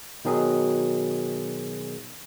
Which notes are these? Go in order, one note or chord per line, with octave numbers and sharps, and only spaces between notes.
B2 D#3 F#3 G#4